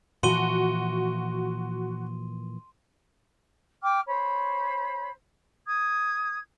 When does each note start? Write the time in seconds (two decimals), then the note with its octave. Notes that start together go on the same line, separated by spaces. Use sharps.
0.23 A#2 E3 F3 F#4 C6 D#7 G7
3.83 G5 D6 F6
4.07 C5 C#5 B5
5.67 D#6 G#6